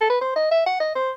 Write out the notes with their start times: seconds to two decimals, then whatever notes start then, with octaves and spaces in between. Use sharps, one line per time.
0.01 A4
0.10 B4
0.21 C5
0.36 D#5
0.51 E5
0.66 F#5
0.80 D#5
0.95 C5